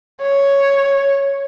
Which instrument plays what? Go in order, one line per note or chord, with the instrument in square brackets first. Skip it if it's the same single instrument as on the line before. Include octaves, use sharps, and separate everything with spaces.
[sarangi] C#5